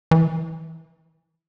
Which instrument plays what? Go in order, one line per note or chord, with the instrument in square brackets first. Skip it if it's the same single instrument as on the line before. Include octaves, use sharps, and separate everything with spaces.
[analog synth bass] E3